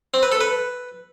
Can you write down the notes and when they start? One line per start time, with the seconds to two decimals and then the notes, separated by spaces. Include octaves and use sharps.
0.14 C4
0.23 B4
0.32 A4
0.41 B4